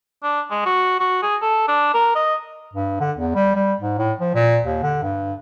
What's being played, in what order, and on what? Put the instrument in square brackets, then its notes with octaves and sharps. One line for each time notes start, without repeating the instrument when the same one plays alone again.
[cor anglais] D4
G#3
F#4
F#4
G#4
A4
D4
A#4
D#5
[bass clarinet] G2
D3
E2
G3
G3
G#2
A2
F3
A#2
D#2
D3
G2